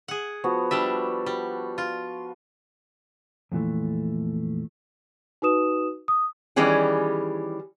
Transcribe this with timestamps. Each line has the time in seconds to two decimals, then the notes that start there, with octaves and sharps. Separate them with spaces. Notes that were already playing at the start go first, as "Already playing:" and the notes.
0.08 G#4 F#5
0.44 F3 B3 F#4
0.71 G3 D4 E5
1.26 G3
1.78 F4
3.52 F2 A#2 E3 A3
5.42 D#4 F#4 B4 D#6 E7
6.08 D#6
6.56 D#3 E3 G3 C#4 G4 G#4